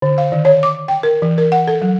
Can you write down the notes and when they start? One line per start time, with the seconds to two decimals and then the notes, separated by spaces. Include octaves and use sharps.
0.02 D3
0.18 F5
0.32 D#3
0.45 C#5
0.63 D6
0.88 G5
1.03 A#4
1.22 E3
1.38 A#4
1.52 F#5
1.68 A4
1.82 F#3